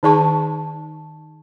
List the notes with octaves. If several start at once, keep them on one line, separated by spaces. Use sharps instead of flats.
D#3 D#4 G#4 D5 A5 C#6